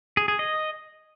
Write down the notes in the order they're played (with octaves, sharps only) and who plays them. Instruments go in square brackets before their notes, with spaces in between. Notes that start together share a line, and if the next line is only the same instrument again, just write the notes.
[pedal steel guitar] G#4
G#4
D#5